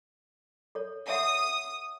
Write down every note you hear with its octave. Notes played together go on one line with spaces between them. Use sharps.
A4 C#5
C#5 E5 F#5 D#6